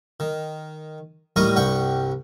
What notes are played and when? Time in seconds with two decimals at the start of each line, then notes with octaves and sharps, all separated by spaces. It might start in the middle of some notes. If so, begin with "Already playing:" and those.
0.20 D#3
1.36 A2 G3 D#4 A#4 C#6 D#6
1.56 C2 G2 F#5 G5 C#6